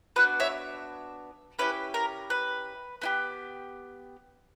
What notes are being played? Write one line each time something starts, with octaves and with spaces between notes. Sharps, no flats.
B3 D4 F#4 B4
C#5 E5
C#4 E4 G4 B4
A#4
B4
B3 E4 G4